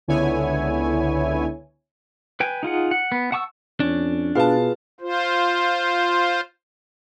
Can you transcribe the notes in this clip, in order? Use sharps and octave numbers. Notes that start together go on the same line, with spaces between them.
C#2 D3 B3 E4 C#5 G#5
B4 G5 G#5
D#4 F4 G#4 F#5
F#5
B3
F#5 A5 C#6 D6 E6
F2 C#4 D4
B2 F4 G#4 B4 F5 A5
F4 C5